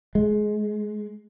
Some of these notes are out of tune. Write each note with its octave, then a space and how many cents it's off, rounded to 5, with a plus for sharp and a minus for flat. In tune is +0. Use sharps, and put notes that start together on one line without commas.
G#3 +20